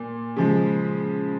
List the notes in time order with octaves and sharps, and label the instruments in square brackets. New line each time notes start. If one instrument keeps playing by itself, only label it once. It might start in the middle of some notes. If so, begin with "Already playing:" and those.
Already playing: [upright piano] A#2
C#3 F3 G#3